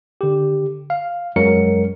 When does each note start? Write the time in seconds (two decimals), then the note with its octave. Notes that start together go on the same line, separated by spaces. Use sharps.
0.21 D3 G4
0.90 F5
1.36 F#2 F#3 G#3 A#4 C#7